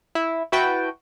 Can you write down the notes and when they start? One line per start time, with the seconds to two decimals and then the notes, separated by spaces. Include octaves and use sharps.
0.15 E4
0.52 E4 F#4 B4 G5 A5